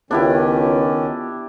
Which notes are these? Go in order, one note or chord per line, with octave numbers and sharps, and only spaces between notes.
C#2 D#3 B3 C#4 D4 E4 F4 G4